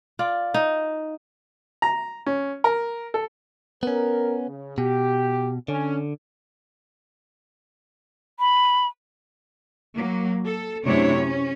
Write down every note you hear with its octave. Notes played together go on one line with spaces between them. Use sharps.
F4 D5
D#4
A#5
C#4
A#4
A4
B3 C#4 A#4
C#3
B2 G4
D3 C#4
B5
F#3 A#3
A4
F#2 C3 A3 D4 E4 C#5
C#4